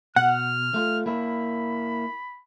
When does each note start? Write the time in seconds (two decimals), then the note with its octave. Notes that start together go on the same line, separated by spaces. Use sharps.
0.16 B2 F#5 F6
0.74 A3 F4
1.06 A#3 E4 B5